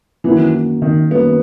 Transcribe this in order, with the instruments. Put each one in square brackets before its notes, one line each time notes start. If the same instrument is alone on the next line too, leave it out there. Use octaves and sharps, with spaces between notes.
[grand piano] F#2 D#3 F#3 A#3 [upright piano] E3
[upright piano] D#3
[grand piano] F#2 D#3 F#3 A#3 [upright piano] B3